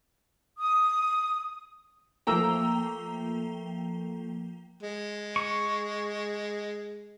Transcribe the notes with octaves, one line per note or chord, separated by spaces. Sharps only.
D#6
F3 A3 A#3 G5 A#5 E6
G#3
C#6